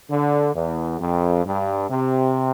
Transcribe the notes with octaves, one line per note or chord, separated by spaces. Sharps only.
D3
E2
F2
G2
C3